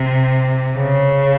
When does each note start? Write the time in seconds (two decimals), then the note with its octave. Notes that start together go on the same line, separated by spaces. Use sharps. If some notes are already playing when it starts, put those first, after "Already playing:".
Already playing: C3
0.77 C#3